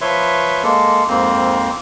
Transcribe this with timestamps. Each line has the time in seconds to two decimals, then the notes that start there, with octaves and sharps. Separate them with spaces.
0.01 F3 B4 C#5 E5 C6
0.63 G#3 A#3 A4
1.08 F2 G#2 A#3 C4